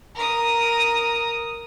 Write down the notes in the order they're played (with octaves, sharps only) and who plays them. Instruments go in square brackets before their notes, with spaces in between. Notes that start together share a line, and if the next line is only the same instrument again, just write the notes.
[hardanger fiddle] A#4 D#6